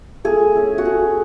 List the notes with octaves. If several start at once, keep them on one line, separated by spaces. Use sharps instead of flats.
A3 G#4
C#4 E4
F#4
A3 G#4